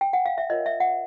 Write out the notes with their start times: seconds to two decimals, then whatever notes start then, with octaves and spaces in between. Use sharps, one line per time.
0.01 G5
0.13 F#5
0.26 F5
0.38 E5
0.50 F4 A#4 C#5 D#5
0.66 E5
0.80 F#5